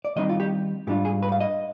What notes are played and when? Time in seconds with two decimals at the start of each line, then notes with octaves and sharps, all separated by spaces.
0.05 D5
0.16 D#3 G3 C4 D#4 D#5
0.29 F4
0.40 G4
0.87 G#2 G3 D4 F4 G4
1.05 G#4
1.23 B4
1.32 F5
1.40 D#5